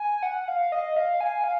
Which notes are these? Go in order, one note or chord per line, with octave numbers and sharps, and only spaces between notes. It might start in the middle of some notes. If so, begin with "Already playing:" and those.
Already playing: G#5
F#5
F5
D#5
F5
G#5
F5